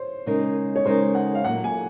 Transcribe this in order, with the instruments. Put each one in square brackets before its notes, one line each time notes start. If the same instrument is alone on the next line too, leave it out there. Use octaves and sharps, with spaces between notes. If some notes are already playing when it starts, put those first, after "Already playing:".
Already playing: [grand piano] C5 C#5
[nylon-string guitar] C#3 G#3 D#4 A#4
[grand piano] C#5
[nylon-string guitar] C#3 G#3 D#4 A#4 [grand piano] C5
[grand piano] F#5
F5
[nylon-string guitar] A#2 F#3 A#3 F4 [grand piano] F#5
[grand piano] G#5